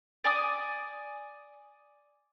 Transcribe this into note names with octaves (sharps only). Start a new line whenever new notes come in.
D5 G#5 D6 D#6